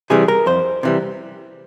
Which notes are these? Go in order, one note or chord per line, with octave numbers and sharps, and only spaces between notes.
C3 E3 G3 G#4
A#4
F2 C5
C3 E3 G3